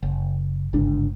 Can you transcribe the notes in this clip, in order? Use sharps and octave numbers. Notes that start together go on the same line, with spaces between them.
F#1
G1 C#2 G#2 D4